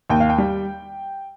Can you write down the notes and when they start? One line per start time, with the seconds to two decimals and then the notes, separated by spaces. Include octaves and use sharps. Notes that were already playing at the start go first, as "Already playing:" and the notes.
0.10 D#2 G5
0.20 F5
0.30 G5
0.38 G3